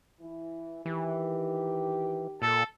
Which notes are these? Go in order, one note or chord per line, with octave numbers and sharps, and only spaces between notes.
E3 E4
D#3 E3 G4
A#2 A4